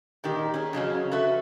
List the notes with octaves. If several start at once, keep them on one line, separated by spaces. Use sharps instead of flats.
A#2 D#3 G4
C#4 G#4
F2 C#3 F#3 C#4
F#4 A4 B4 E5